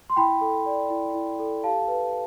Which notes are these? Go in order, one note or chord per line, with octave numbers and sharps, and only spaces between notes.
C6
E4 G5 B5
A4
D5
E4
E4
A4
G4 F5 A5
B4